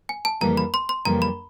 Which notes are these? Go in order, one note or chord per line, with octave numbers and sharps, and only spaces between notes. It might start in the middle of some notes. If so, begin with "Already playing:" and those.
G#5
A5
F2 C#3 E3 G3 A#3 A#5
B5
C6
C6
F2 C#3 E3 G3 A#3 A#5
B5